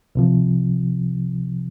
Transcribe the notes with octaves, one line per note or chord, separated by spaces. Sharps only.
C2 C3 F3